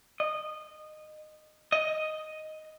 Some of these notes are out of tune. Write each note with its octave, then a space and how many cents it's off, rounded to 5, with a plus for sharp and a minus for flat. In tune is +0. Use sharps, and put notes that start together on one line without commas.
D#5 -20
D#5 +0